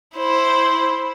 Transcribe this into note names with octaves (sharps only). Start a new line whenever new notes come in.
E4 C5